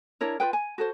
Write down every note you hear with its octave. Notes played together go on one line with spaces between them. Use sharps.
D4 E4 A#4 C#5
F4 G#4 B4 G5
G#5
F#4 A4 C5